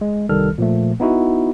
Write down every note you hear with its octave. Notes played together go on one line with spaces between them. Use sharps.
G#3
C2 D#3 G3 A4 F6
A#2 F3 A3
B3 D#4 E4 F#4